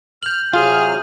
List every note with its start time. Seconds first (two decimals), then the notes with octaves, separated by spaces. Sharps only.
0.23 F6 G6 F#7
0.53 C3 F#3 F4 G#4 F6